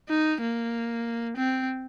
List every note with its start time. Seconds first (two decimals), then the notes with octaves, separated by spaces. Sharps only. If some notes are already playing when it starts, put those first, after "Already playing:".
0.09 D#4
0.41 A#3
1.37 C4